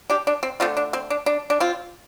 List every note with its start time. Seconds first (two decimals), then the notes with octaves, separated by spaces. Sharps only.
0.10 D4 G4
0.27 D4
0.43 C4
0.60 D3 A3 C4 F4
0.77 D4
0.93 C4
1.10 D4
1.26 D4
1.50 D4
1.60 C4 F4